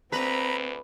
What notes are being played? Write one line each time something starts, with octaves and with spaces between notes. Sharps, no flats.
D2 C4 B4 A#5 B5